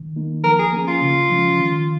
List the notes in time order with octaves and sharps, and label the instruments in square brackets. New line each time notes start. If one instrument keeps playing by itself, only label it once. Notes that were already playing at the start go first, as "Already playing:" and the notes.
Already playing: [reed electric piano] D#3
A#3 D#4
[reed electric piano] F3 [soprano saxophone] A#4
[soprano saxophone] G#4
[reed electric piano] A#3 C#4
[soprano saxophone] F4
[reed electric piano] C#3
F3 G#3 C#4
D#3